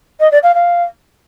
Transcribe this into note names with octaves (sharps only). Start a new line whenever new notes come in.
D#5
D5
F5
F5